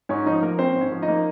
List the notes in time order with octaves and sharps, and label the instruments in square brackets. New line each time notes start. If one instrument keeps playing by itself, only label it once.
[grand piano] G#2 C#4 C#5
F3 D#4 D#5
A#3 A#4
C4 C#4 C5
G#2
C#4 C#5
F3
D#4 D#5
A#3